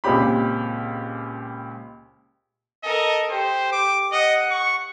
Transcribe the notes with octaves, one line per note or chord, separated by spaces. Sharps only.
C#2 A#2 C4 G4 B5
A4 A#4 D#5
G4 C5
D6
D#5 F#5
C#6